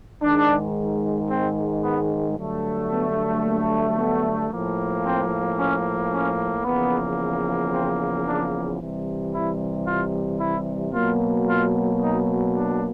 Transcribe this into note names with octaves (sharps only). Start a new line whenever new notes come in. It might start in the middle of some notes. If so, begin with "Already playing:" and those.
G#2 D#3 G#3 D4
C4
B3
G2 D3 F#3 A3
B3
A#3
B3
A2 F3 A#3
C4
C#4
C#4
E2 C#3 F3 A#3 B3
C4
D4
C3 E3 G3
E4
F4
E4
B2 F#3 A#3 F4
F4
D#4
D4